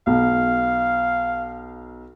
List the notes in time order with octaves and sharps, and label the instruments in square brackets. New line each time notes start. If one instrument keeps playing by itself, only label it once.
[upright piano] B1 [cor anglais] F5